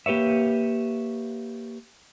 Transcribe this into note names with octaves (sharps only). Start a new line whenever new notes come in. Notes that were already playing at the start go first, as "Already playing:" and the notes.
A#3 G4 B4 C#5 E5